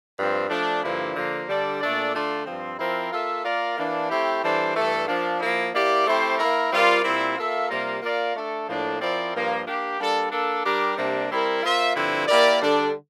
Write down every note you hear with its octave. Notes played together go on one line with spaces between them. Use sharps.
G2 F3 C4
F3 A3 D4
G2 D3 F3 A#3 E4
D3 F3 A#3
D3 G3 D4 A4 D5
A#2 A3 D4 A4 D5
D3 A3 D4 F4
G2 F3 C4
F3 C4 E4 A#4
A#3 F4 A4 E5
A#3 F4 A#4 D5
E3 A#3 D4
A3 C4 E4 G4
E3 G3 D4 A4 C5
G2 E3 A3 D4 A4
F3 A#3 D4
F3 A#3 E4
A#3 E4 G4 D5
A3 C4 E4 G4 C5
A#3 E4 A#4
G3 C4 F4 A#4 D5
A#2 G3 C4 E4
A#3 F4 A4 E5
C3 G3 A#3 F4 A#4
A#3 F4 A#4 D5
A3 D4 A4
A2 F3 A#3 D4 A4
F3 C4 E4 A#4 D5
G2 F3 A#3 F4
A#3 D4 G4
G3 A#3 D4 A4
A#3 D4 A4
G3 D4 G4 A#4
C3 G3 A#3 D4
G3 C4 E4 A#4
A#3 F4 C5 E5
G2 D3 F3 C4 E4
A#3 E4 G4 A#4 D5
D3 G3 D4 A4